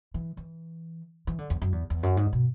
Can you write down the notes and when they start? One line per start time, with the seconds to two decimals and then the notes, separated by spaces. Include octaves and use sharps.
0.14 E3
0.37 E3
1.27 E3
1.38 D3
1.50 E2
1.62 F#2
1.72 E2
1.90 E2
2.03 F#2
2.17 G#2
2.33 B2